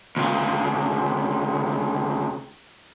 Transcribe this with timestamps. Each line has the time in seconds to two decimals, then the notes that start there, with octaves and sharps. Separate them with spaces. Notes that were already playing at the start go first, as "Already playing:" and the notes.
0.16 D2 C#3